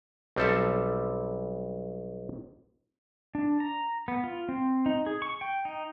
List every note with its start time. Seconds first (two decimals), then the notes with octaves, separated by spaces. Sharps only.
0.36 B1 G3 C4 A4 E5
3.35 D4
3.60 A#5
4.08 B3
4.24 F4
4.49 C4
4.86 D#4
5.06 G#4
5.22 C#6
5.41 G5
5.65 D#4